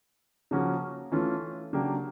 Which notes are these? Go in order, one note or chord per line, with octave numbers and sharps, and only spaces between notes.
C#3 F3 A#3 C#4 F#4
E3 A3 C#4 F4
C#3 F#3 A#3 D4 G4